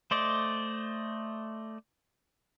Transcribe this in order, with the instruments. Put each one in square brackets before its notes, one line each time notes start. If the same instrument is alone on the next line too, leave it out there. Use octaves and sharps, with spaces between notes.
[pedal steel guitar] A3 C5 D5 D#5